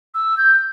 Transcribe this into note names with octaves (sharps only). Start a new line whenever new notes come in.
E6
G6